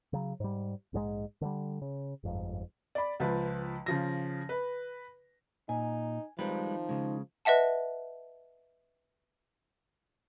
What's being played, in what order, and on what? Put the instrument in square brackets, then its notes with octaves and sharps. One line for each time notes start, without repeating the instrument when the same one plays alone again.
[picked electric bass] C#3 F#3
G#2 G3
A#1 G#2 C3 G#3
D3 E3 G3
C#3
G1 F2 G#2
[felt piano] D5 B5
C#2 F3 B4
C#3 F3 A#6
B4
[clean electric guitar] A#2 [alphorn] D#4 [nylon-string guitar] G#5
[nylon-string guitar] D#3 C4 D#4 [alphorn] F3 [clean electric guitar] G3 G#3 B4
[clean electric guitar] C#3 G#3
[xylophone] B4 D#5 E5 F#5 A5